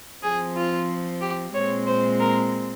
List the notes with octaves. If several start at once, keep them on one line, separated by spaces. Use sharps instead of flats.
F3 C4 G#4
F4
G4
A#2 G#3 C4 C#5
C5
A#4